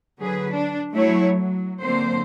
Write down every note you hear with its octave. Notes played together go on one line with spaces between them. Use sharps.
D3 F#3 G#4 B4
D4
F#3 A3 E4 C#5
F#3
D3 F#3 A#3 C4 C5